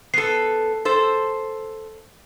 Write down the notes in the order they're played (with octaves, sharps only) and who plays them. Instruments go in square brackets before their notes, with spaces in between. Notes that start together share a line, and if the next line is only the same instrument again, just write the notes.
[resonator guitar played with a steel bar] B3 A4 [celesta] C7
[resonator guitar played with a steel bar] A4 C5